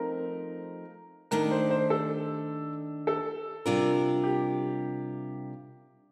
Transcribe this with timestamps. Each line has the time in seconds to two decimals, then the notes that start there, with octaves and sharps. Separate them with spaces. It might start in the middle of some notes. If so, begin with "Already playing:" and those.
Already playing: F3 A3 C4 D#4 A#4
1.31 D#3 A3 D4 A#4
1.51 C5
1.70 C5
1.90 A4
3.07 A4
3.66 C3 G3 D4 F4 A#4
4.23 G4